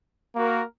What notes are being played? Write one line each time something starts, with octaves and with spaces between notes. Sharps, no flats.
A#3 F#4 A#4